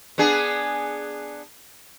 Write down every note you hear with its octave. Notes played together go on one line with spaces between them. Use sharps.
B3 D4 G#4